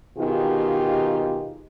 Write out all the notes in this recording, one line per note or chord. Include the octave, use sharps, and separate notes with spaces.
B2 D#3 D#4 F4 G4 G#4